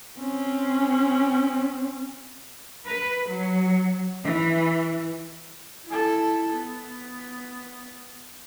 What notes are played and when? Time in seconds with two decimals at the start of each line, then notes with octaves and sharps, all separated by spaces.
0.19 C4 C#4
2.85 B4
3.29 F#3
4.25 E3
5.87 E4 A4
6.54 B3